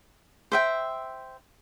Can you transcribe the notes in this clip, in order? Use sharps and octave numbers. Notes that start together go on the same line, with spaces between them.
C5 E5 G5